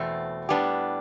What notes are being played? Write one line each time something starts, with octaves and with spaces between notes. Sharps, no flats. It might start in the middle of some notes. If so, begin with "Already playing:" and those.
Already playing: E2 B2 A3 C4
A2 G3 B3 D4 G4